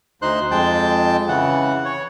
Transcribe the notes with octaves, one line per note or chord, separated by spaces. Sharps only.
D2 D#4 C5 C6 F#6
F2 G#3 G5 A5 G6
C#3 E3 F#5
C#5